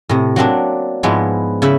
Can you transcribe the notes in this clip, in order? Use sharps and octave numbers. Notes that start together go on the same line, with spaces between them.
A2 C3
F#3 A#3 C4 D4
G#2 F3 G#3 B3 E4
C#3 E4 E5 B5